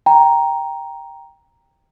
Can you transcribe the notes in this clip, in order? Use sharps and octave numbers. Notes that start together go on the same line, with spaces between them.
G5 A#5